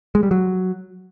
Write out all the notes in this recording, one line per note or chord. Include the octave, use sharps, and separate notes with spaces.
G#3
G3
F#3